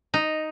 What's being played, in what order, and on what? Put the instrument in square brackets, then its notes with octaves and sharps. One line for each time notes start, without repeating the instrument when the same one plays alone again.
[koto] D#4